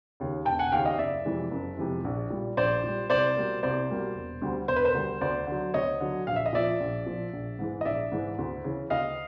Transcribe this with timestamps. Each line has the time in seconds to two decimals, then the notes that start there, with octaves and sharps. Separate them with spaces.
0.20 D#2 C#3
0.45 E1 G5 A5
0.59 F#5 G#5
0.72 D#2 C#3 F5 G5
0.85 D#5 F5
0.98 F#1 D5 E5
1.25 F2 C3 E3 G#3
1.51 F#1
1.77 F2 C3 E3 G#3
2.04 A#1
2.30 A#2 G3
2.57 A#1 C5 D5
2.84 A#2 G3
3.10 C2 C5 D5
3.36 B2 G3 A#3
3.63 C2 C5 D5
3.90 B2 G3 A#3
4.15 E1
4.42 D2 D3 G3
4.68 E1 C5
4.76 B4
4.85 A#4 C5
4.94 D2 D3 G3
5.21 D2 C5 D5
5.47 D3 F#3
5.74 D2 C#5 D#5
6.00 D3 F#3
6.27 A#1 F5
6.36 E5
6.46 D#5
6.53 A#2 F3 D5 E5
6.80 A#1
7.06 A#2 F3
7.33 A#1
7.59 G#2 E3 G#3
7.81 D#5
7.85 A#1 D5 E5
8.12 G#2 E3 G#3
8.38 D2
8.64 C#3 E3
8.90 D2 D#5 F5